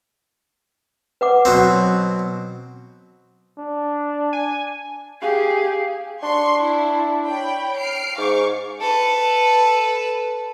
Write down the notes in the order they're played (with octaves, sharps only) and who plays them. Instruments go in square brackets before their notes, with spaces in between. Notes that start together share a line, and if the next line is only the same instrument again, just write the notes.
[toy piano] B4 F#5 D6
[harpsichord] B2 F#3 C4
[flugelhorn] D4
[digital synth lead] G#5
[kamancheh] G4 G#4 [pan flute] F5
[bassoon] D4 [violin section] C6 C#6
[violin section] E4
C#5 G5 B5
F6 C7 D7
[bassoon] G#2 [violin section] F5 C#6 D6
[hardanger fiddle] A4 B4